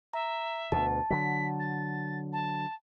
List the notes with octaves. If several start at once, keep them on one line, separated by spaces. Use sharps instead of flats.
E5 A#5
D2 B2 A5
D3 F#3 B6
A6
A5